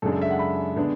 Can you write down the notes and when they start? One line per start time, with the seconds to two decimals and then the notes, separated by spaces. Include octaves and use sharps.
0.02 F#2 C#3 G#3 D4 A4
0.13 A4
0.22 E5
0.31 F#5
0.39 B5
0.76 D3 G#3 B3 D4